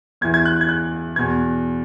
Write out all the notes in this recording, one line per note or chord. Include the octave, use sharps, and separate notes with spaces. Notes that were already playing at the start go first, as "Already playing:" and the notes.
E2 E3 G#6
G#6
F#6
G#6
F#6
E2 B2 G#6